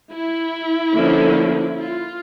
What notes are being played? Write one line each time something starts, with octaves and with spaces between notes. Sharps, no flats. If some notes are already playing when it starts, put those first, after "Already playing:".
E4
D3 F3 A#3 C#4
F4